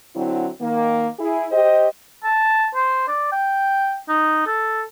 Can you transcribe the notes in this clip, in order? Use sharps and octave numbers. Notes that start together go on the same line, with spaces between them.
D3 F#3 C4 E4
D#3 A#3
E4 G#4
G4 C5 D#5
A5
C5
D5
G5
D#4
A4